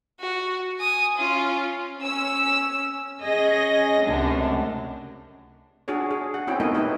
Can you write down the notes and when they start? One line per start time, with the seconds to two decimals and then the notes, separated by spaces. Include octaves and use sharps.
0.20 F#4
0.80 G#5 D#6
1.18 C#4 F4
2.01 C#4 E6
3.22 C#4 G#4 D#5 A#6
4.05 C#2 F#2 C3 A3 D4
5.88 D4 F#4 G#4 C#5
6.11 G#4
6.34 F#5
6.47 C4 C#4 E4 F#4 G5
6.60 A3 B3 D#4 E4 A#4 D#5
6.75 D#4 E4 G4 B4 D#5